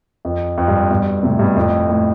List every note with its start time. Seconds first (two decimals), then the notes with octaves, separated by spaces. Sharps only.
0.25 F2
0.58 F2
0.68 G2
0.90 G2 B2
1.23 A2 C3
1.39 G2 B2
1.56 F2 A2
1.89 A2